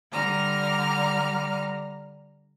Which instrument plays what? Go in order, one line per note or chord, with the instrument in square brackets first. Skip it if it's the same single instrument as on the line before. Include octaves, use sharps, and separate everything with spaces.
[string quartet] D3 G3 A#5 D6 F6